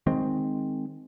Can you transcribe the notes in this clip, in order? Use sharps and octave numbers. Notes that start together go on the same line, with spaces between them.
D#3 G#3 C4